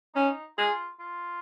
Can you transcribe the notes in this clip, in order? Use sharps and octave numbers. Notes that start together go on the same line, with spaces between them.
C#4 D#4
F4 G#4
F4